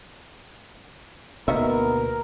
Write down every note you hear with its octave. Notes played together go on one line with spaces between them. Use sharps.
D2 B2 D#3 A#3 B3 A#4 E5